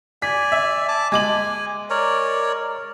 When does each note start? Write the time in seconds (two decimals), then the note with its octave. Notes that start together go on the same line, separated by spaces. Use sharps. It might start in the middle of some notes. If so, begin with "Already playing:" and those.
0.22 D5 G#5 B6
0.52 E5
0.88 A5 D6
1.12 G#3 G#5 D6 F#7
1.90 A#4 C#5 D5